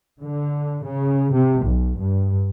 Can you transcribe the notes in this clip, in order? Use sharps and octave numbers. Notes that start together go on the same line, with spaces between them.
D3
C#3
C3
B1
G2